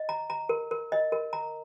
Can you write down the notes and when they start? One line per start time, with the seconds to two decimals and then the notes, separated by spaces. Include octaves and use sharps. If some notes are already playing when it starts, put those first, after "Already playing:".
Already playing: D#5
0.09 A#5
0.30 A#5
0.49 A#4
0.71 A#4
0.92 D#5
1.12 A#4
1.33 A#5